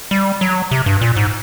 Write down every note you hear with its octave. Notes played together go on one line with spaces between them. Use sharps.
G3
F#3
C3
G2
A#2
G#2